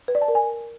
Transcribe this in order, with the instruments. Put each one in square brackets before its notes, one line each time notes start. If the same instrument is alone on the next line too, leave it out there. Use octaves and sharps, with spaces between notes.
[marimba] B4
D5
A5
A#4
G#5